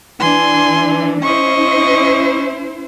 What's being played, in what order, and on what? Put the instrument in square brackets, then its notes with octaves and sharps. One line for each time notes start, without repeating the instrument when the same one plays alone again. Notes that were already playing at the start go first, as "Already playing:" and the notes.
[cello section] E3 D4 [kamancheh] G#5 C6
[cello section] C#4 E4 C5 [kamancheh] D#5 C#6